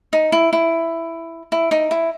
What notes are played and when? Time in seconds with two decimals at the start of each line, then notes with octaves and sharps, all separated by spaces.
0.13 D#4
0.32 E4
0.53 E4
1.52 E4
1.71 D#4
1.91 E4